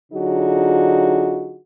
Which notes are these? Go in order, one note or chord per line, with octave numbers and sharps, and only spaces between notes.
D3 F#3 D#4 F4 F#4 G#4